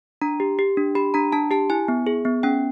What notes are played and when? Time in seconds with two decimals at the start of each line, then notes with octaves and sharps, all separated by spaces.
0.22 D4 A#5
0.40 G4
0.59 G4
0.77 D4
0.95 G4 B5
1.14 D4 A#5
1.32 D4 A5
1.51 G4 A5
1.70 E4 G#5
1.88 B3
2.07 G#4
2.25 B3
2.43 C#4 G5